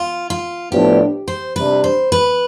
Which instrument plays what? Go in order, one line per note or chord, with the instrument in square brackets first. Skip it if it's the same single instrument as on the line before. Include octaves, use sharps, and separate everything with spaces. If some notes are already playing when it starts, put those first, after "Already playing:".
Already playing: [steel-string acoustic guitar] F4
F4
[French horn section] A2 F3 B3 D4 [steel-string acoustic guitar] G4
[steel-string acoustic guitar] C5
[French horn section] C3 G3 D4 [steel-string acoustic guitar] B4
[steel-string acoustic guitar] C5
B4